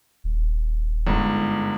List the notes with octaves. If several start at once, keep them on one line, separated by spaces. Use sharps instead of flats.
D#1
G1 G#2